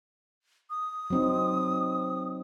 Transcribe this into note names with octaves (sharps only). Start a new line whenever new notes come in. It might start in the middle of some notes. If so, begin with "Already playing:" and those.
D#6
F#3 C4 D#4